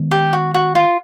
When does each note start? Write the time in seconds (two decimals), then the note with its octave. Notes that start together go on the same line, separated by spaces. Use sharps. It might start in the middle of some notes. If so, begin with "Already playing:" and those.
Already playing: D#3 G#3 B3
0.11 G4
0.33 F#4
0.54 F#4
0.75 F4